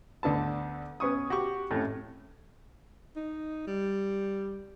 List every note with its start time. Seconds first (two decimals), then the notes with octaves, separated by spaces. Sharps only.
0.23 D2 D3 B3 A5
1.00 B3 C#4 C#6 D#6
1.30 F#4 G4 F#5 C#6
1.71 F2 A2 A3 C#4
3.16 D#4
3.67 G3